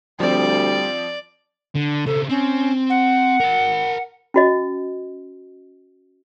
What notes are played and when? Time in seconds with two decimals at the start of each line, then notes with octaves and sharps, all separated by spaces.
0.20 D2 F3 G3 C4 D5
1.75 D3
2.06 C#3 C4 A4
2.30 C4 C#4
2.90 F#5
3.40 A#4 A5
4.34 C#4 F#4 D#5